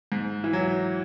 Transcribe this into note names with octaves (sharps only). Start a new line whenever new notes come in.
G#2
E3
F#3